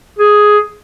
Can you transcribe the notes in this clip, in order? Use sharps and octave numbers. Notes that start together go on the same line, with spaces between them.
G#4